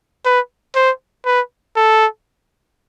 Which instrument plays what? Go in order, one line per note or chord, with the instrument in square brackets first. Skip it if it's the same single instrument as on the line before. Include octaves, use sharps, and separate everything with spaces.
[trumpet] B4
C5
B4
A4